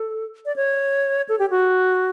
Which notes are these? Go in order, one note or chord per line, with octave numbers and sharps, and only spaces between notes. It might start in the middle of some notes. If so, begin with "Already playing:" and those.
Already playing: A4
D5
C#5
A4
G4
F#4